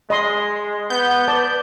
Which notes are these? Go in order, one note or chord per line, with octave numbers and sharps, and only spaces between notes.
G#3 D#5 B5 C6
B3 G6
B4 D5 A5